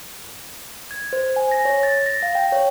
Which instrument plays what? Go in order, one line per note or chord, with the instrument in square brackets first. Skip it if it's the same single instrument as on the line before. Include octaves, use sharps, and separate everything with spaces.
[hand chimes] G#6
C5
G#5
A#6
C#5
A6
A#6
F5
G5
C#5